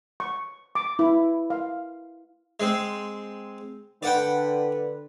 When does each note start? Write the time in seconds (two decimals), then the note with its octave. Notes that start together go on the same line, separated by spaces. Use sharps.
0.20 C#6
0.75 D6
0.99 E4
1.50 F5
2.60 G#3 C4
4.03 D3 B4 D5 F#5 G5